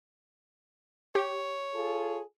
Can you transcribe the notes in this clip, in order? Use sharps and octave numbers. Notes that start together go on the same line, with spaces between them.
G4 C#5
F4 G#4 A4